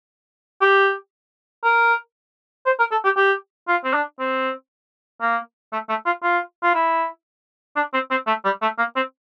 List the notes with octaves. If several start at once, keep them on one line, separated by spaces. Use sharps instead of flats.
G4
A#4
C5
A#4
A4
G4
G4
F4
C4
D4
C4
A#3
A3
A3
F4
F4
F4
E4
D4
C4
C4
A3
G3
A3
A#3
C4